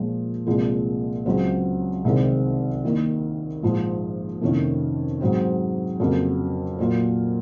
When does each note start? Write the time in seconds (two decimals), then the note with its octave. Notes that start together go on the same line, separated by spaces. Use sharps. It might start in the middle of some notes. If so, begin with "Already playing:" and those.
Already playing: A#2 F3 G#3
0.47 C2 A#2 F3 G#3
1.26 C#2 C#3 F#3 C4
2.04 C2 C3 D#3 G#3 C4
2.84 D#2 D#3 A#3
3.62 A#1 G#2 F3
4.41 F2 C3 D#3 A#3 C#4
5.21 G#2 F#3 C4
5.99 F2 C#3 F#3 A#3
6.78 A#2 F#3 A#3